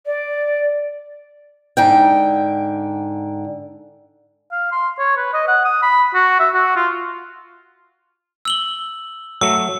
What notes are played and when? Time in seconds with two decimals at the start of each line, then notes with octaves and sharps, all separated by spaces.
0.05 D5
1.77 G#2 D3 G5
4.52 F5
4.72 C6
4.98 C#5
5.17 B4
5.33 D#5
5.48 F#5
5.65 D#6
5.83 B5
6.14 F#4
6.40 E5
6.54 F#4
6.76 F4
8.45 E6 F#7 G7
9.41 F#3 A3 E6